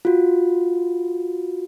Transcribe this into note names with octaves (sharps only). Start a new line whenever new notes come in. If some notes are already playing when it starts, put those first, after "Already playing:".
F4 F#4